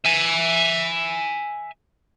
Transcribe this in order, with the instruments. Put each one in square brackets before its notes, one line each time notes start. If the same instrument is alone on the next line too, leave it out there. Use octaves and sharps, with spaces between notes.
[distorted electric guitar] E5 G#5